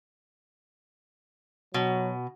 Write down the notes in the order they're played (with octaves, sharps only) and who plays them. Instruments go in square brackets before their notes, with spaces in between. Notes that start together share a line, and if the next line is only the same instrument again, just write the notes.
[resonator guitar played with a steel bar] B2 [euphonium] F#3